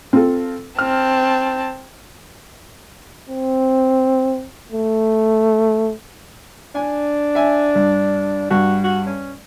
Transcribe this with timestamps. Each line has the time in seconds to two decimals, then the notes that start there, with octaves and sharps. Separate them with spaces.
0.13 C4 F4 A4
0.79 C4 A5 F6
3.29 C4
4.72 A3
6.75 D4 G#5
7.35 E5 G#5
7.75 G2
8.51 G2 F#4
8.84 F#4
9.06 C#4